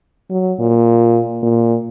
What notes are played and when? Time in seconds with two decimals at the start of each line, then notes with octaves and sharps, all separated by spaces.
0.31 F#3
0.60 A#2
1.43 A#2